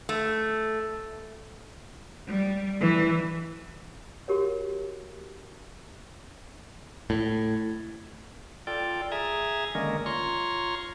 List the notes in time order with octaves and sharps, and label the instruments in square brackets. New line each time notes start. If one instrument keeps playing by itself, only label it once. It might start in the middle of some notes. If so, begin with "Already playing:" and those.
[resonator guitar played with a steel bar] A3
[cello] G3
E3
[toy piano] F#4 G4 A#4 C#5
[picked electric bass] A2
[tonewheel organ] F4 A4 D5 G5
G#4 E5 G#5 A#5
D3 D#3 G#3 A#3 C#4 A#4
F4 C#5 A#5 C6 C#6